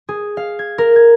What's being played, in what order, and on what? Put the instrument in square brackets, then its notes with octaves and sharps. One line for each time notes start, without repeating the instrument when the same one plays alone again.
[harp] G#4
F5
G#6
A#4
G#6